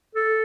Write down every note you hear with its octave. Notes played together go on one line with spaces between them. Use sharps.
A4